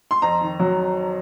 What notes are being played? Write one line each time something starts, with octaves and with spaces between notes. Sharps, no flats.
C6
F2 A#5
D#3
F#3